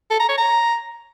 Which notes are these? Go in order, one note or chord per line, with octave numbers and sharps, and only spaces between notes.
A4
A#5
C#5
A#5